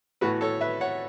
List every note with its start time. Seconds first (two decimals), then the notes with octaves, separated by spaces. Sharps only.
0.21 A2 E3 B3 F#4 B4
0.41 A4 C#5
0.61 B4 E5
0.81 C#5 F#5